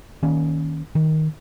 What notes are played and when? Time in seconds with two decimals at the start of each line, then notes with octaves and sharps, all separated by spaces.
0.23 D#3 A#3 C#4
0.95 D#3